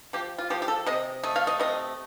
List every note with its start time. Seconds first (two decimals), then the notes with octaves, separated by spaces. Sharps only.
0.13 F3 G4
0.38 F4
0.50 F3 G4
0.62 G4
0.68 A4
0.86 C3 D#5
1.23 A3 D#5
1.36 F5
1.47 D#5
1.60 C3 D#5